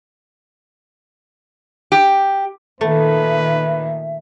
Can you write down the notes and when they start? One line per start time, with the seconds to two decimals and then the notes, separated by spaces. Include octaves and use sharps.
1.92 G4
2.81 A#2 D#3 A3 B4 E5